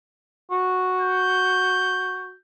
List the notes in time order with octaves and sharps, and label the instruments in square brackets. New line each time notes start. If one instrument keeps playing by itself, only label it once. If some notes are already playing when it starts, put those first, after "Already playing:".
[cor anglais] F#4
[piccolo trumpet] G6